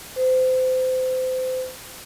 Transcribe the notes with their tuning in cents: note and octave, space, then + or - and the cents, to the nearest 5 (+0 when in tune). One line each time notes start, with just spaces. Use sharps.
C5 -30